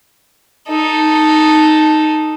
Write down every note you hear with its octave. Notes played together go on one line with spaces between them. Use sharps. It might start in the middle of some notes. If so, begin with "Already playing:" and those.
D#4 A4